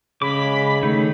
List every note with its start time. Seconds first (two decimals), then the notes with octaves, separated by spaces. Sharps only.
0.22 C#3 G#3 B5 D6
0.83 D#3 A3 D#4